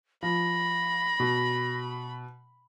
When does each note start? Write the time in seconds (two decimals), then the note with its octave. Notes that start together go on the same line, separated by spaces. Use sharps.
0.23 F3 B5 A#6
1.20 B2